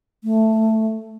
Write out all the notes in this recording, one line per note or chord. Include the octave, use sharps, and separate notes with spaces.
A3